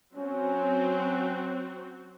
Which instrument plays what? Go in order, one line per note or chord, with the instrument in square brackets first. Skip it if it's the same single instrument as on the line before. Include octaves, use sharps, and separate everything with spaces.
[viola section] F#3 C4 F#4 [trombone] C#4